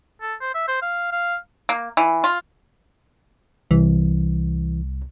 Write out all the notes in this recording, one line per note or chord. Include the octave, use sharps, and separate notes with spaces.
A4
C5
E5
C5
F5
F5
A#3
E3
F4
C2 E3